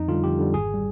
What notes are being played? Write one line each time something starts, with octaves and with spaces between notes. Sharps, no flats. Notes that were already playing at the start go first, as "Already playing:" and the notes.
Already playing: F2 D#4
D3 G3 F4
F2 G4
D3 G3
G#1 G#4
G3